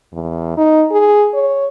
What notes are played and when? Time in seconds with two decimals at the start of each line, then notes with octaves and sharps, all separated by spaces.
0.13 E2
0.57 D#4
0.91 G#4
1.34 C#5